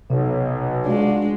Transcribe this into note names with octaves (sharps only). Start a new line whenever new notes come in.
B1 C3
G#3 D4 F4 F#4